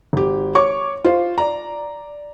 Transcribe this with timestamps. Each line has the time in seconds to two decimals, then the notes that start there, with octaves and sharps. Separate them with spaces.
0.13 G#1 G4
0.55 C#5 C#6 D6
1.04 F4 C5
1.38 D5 A#5